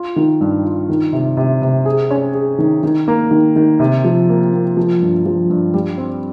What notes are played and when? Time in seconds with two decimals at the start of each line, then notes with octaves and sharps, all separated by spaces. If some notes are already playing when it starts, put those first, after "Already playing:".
Already playing: F4
0.16 D#3
0.41 G2
0.65 F4
0.89 D#3
1.13 C3
1.37 C3
1.62 C3
1.86 G#4
2.11 C#4
2.34 G#4
2.58 D#3
2.83 D#3
3.08 A#3
3.31 D#3
3.56 D#3
3.80 C3
4.04 F3
4.29 A#3
4.53 A#3
4.77 F3
5.01 G2
5.26 F3
5.50 G2
5.74 G3
5.98 C4